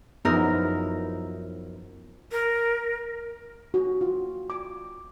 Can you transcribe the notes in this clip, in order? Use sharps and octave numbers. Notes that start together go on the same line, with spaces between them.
F#2 F3 B3 D#4 E4 A#4
A#4
F#4
F4
D6